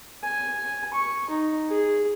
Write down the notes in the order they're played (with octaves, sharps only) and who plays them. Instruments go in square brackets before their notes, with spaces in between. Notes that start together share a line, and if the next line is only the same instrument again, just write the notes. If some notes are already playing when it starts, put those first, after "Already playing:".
[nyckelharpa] G#5
C#6
D#4
G#4